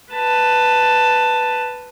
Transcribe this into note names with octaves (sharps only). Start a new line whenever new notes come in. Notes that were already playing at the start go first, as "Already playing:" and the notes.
B4 A5